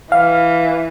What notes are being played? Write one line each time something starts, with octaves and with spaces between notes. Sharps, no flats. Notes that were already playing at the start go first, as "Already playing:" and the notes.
E3 F5